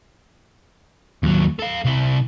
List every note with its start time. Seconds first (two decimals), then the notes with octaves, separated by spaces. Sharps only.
1.23 D#2 F#3
1.59 A4 F5
1.85 C3 E4